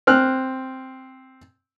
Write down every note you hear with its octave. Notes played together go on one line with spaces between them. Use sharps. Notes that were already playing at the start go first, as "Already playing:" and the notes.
C4 F6 F#6